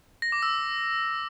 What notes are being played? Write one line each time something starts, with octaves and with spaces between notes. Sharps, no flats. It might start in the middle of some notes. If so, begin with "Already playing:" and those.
A#6
D6
E6